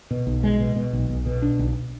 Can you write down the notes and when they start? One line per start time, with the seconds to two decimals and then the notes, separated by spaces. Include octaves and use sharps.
0.11 B2
0.27 B1
0.44 G#3
0.60 B2
0.76 B2
0.93 B1
1.10 B1
1.26 B2
1.42 D4
1.59 B1